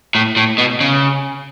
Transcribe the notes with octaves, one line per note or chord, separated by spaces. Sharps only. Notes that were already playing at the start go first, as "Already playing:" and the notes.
A2
A2
B2
C#3